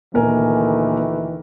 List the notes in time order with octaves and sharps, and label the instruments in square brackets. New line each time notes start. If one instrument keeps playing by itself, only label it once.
[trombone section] D2 D#3 E3 [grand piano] A#2 A#4 G#5